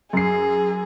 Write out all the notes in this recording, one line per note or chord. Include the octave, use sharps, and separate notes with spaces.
F#2 G#4 C7